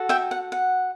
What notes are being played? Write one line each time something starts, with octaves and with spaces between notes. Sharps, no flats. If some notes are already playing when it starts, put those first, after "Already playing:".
Already playing: F#4 A4
E5 G5
F#5
F#5